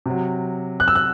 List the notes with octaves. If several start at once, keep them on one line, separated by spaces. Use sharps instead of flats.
C3 F#3
F#6
E6
F#6